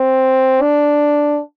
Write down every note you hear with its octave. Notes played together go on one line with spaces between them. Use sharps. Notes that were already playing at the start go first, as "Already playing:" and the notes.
Already playing: C4
D4